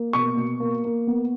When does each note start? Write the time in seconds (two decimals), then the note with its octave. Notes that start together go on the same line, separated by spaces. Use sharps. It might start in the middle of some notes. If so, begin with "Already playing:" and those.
Already playing: A#3
0.13 B2 C#6
0.37 B2
0.60 A#3
0.84 A#3
1.07 B3